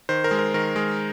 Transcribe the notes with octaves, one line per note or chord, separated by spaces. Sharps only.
D#3 C5
A#4
G#3
A#4
D#3 A#4
G#3